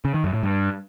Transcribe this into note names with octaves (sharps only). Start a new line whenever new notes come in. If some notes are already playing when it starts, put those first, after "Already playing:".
C#3
D#3
F#2
A2
G2